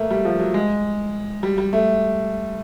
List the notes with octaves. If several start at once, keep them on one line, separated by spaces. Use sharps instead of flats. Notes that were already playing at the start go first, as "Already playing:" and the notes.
Already playing: A3 A#3
G3
F3
F#3
G#3
G3
G3
A3